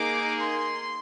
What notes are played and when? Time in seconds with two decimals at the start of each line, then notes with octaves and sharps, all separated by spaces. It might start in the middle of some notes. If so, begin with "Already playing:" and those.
Already playing: A#3 D#4 G#4 D6
0.39 C6